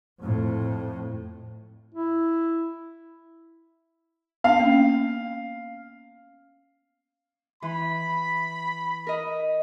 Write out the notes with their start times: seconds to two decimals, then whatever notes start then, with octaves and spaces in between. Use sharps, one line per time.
0.21 F2 A2
1.95 E4
4.44 B3 D4 F5
4.60 A#3 C#4
7.62 E3 B5
9.07 A#4 D#5